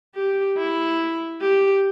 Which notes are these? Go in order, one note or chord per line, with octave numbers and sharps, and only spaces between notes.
G4
E4
G4